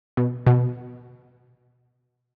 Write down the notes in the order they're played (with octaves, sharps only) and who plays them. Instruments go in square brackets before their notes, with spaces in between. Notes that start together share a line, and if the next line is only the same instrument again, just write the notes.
[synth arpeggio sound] B2
B2